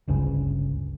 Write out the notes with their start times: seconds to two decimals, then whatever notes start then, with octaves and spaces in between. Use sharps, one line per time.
0.08 G1 C#2 G2 C#3